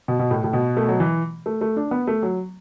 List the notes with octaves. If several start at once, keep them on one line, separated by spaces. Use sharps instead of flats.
B2
B2
A2
A2
B2
A3
F#3
E3
A3
A3
D4
B3
A3
F#3